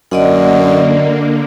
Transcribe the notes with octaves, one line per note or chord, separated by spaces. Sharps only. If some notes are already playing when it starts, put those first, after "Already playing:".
F#2 D3 A#3 D5 D#5 F#5